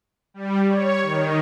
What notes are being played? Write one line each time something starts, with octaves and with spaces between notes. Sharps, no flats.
G3
C#5
D#3